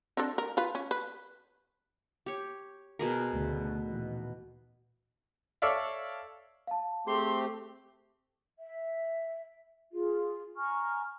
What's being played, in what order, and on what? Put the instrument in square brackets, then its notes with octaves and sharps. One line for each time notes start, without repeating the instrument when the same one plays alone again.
[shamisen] C4 D4 A4
A#4
F4 B4
C#4
B4
[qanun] G4 C#5
B2 G#4 A#4
[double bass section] D2 C#3 A3
A#2 D#3 E3
[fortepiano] A4 C#5 D5 E5 F5
[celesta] F5 A5
[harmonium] A3 C4 G4 [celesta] G#4 [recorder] C6
[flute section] E5
F4 G#4
G#5 A#5 C#6 F6